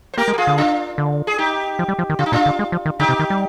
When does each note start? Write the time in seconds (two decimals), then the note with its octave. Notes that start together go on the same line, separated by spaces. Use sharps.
0.14 C5
0.18 A#3 G4 A#4
0.28 G#3
0.33 G4
0.38 F4 G#4
0.47 D3
0.58 D4 F4
0.98 D3
1.27 G#4
1.38 D#4 G4
1.79 F3
1.89 G3
1.99 F3
2.09 D#3
2.19 D3 F4
2.26 D#4
2.32 A#2 D4 F4
2.46 D3
2.59 G#3
2.72 F3
2.86 D#3
2.99 D3 D#4 G4
3.09 C3
3.19 D#3
3.30 G3